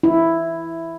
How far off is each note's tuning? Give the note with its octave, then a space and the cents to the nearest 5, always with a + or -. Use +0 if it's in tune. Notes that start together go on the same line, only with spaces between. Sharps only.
E4 +5